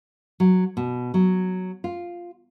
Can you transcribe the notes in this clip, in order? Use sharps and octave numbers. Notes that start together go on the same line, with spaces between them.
F#3
B2
F#3
F4